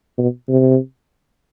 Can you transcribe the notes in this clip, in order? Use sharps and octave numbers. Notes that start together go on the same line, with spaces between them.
B2
C3